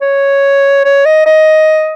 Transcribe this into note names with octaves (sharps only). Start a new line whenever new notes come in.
C#5
C#5
D#5
D#5